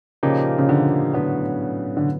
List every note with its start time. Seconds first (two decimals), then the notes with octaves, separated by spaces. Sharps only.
0.23 A#2 C#3 F3 A#3 D#4 G4
0.58 C#3
0.69 D3
1.14 A2 D3 F#3 B3
1.97 D3